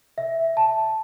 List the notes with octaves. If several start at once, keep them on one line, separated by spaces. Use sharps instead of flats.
E5
A5